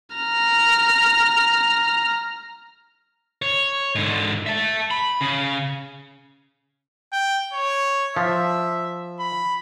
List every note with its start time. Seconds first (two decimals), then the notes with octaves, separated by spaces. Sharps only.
0.16 A#5 F6
3.42 C#5
3.95 G#2 D3
4.46 E5 A5
4.91 B5
5.21 C#3
7.13 G5
7.53 C#5
8.16 F3 E5
9.20 B5